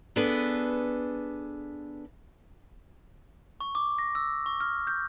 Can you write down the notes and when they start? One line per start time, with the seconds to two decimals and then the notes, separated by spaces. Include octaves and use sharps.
0.16 B3 D4 G#4 A4 B4
3.61 C#6
3.75 D6
3.99 A#6
4.15 E6
4.46 C#6
4.60 F6
4.87 G6